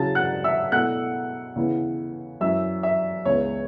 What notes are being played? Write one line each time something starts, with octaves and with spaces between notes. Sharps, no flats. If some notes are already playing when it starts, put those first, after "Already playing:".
Already playing: C#3 F#3 C#4 E4 A5 A6
F#5 F#6
E5 E6
B2 A3 E4 F#5 F#6
C#3 E3 B3 E4
F#2 E3 C#4 E5 E6
E5
C#2 C#3 E3 B3 E4 C#5